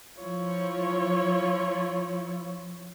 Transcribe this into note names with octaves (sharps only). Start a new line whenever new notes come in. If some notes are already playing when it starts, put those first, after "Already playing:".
F3 E4 F4 C#5